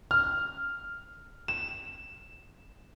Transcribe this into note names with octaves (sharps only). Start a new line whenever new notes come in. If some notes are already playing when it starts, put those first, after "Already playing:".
F6
E7